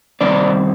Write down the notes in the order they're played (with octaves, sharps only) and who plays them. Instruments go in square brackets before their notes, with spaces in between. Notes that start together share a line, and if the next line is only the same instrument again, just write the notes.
[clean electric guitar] D#3 G3 C4 D4 D#4 D5